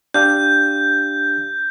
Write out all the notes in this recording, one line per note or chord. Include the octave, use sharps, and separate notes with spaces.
D4 G4 F5 G6